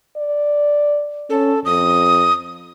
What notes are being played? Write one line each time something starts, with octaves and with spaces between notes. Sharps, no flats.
D5
C#4 A4
F2 D#6